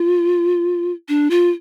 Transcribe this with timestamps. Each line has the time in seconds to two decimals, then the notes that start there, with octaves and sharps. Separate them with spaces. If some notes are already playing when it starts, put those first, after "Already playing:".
Already playing: F4
1.09 D4
1.30 F4